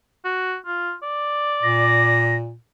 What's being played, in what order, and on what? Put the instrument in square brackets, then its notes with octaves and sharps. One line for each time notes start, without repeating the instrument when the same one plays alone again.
[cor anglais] F#4
F4
D5
[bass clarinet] A#2 [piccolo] A#6